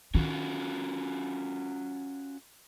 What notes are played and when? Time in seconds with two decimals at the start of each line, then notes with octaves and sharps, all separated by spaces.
0.15 D#3 C#4 F4 F#4